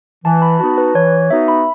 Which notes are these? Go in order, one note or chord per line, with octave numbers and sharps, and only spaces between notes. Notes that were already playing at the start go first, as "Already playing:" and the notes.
E3 A5
B5
B3 D#4 F#4 A5
B4
E3 C#5
B3 D#4 F#4 E5
B5